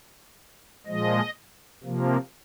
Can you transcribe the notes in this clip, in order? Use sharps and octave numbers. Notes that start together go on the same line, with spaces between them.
A#2 F3 G#3 D#5
C3 F3 A#3